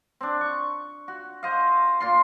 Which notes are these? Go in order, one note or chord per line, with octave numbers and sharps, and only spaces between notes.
C4 D4
C#6
F#4
C5 D#5 F5
A#2 F4 C6